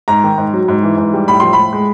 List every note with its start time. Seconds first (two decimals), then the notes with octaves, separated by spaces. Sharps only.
0.08 G#2 A#5
0.24 D#3
0.38 G#2
0.53 F#3
0.68 G#2
0.83 E3
0.98 G#2
1.13 G3
1.28 A2 B5
1.40 F3 C6
1.53 B5
1.58 A2
1.73 G#3